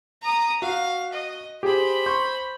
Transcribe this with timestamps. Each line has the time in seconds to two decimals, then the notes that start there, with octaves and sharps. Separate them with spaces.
0.22 A#5 D#6
0.62 F#4 F5
1.13 D#5
1.63 G4 G#4 C5 B5
2.06 C6 C#6 G6